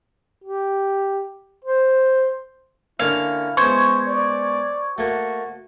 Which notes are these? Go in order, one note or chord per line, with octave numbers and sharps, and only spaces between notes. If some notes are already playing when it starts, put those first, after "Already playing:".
G4
C5
D3 A#3 C#4 E4 F5
G#3 B3 C#4 C5 C#6 G#6
D5
A3 A#3 F#4